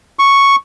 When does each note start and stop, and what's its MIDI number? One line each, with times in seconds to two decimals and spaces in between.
0.19 0.56 85